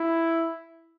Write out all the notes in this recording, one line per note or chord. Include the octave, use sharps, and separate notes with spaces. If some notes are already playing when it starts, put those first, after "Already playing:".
Already playing: E4